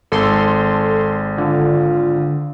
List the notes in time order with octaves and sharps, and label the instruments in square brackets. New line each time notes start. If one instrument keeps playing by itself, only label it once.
[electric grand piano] G#1 [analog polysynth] A4 C6
[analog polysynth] D3 [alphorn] F4